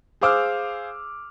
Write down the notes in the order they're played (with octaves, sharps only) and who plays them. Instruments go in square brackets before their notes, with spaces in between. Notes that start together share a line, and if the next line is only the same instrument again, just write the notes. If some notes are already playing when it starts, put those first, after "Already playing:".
[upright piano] G#4 C5 F5 D6 E6 F6